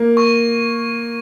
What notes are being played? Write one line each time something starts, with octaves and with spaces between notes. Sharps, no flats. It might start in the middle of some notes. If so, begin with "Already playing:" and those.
Already playing: A#3
C#6